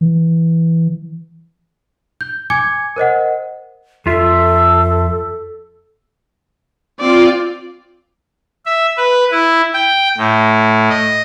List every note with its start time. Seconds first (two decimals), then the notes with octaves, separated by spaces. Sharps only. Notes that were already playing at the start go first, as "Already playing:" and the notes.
0.01 E3
2.21 G6
2.50 G#5 D6 G#6 C#7
2.96 A#4 C5 D#5 F#5
4.06 F2 F4 A4 E5
7.00 C4 F4 D5
8.66 E5
8.97 B4
9.31 E4
9.74 G5
10.17 A2
10.89 D#5